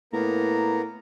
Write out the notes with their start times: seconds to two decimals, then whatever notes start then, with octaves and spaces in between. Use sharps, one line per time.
0.13 A2 A#3 B3 A#5